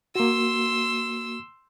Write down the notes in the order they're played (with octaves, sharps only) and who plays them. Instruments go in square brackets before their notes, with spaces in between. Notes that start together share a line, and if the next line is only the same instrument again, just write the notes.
[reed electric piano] A#3 F#4 [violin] C6 E6